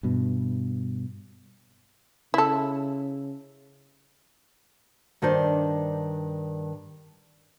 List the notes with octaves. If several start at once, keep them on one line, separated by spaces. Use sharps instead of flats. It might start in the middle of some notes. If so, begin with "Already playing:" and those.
G2 B2
C#3 E4 A4
G2 D#3 D4 C5 D5